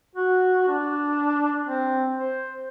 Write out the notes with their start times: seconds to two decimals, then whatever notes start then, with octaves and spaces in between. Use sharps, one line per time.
0.15 F#4
0.69 D4
1.67 C4
2.19 C5